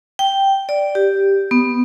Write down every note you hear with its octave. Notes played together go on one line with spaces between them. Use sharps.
G5
D5
G4
B3